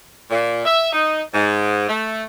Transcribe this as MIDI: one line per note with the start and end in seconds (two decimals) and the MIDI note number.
0.30 0.63 46
0.65 0.91 76
0.93 1.21 63
1.33 1.87 44
1.88 2.23 57